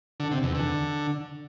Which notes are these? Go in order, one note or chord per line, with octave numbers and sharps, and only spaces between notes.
D3
C3
E2
D3